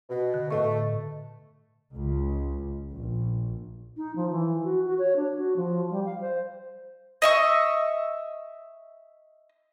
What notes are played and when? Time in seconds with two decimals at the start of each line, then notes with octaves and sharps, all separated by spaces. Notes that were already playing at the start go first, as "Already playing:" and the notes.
0.10 B2
0.34 D3
0.50 A2 A3 D#5 C#6
1.94 C#2
2.93 A#1
3.97 D#4
4.15 F3
4.31 E3
4.63 F#4
4.85 F#4
4.98 C#5
5.16 D4
5.37 F#4
5.56 F3
5.90 G3
6.05 F5
6.21 C5
7.22 D#5 E5 C#6